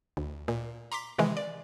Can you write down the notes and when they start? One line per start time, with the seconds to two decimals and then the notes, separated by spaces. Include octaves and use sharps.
0.17 D2
0.48 A#2
0.92 A#5 C6 D6 B6
1.18 C3 D#3 E3 G#3
1.37 D5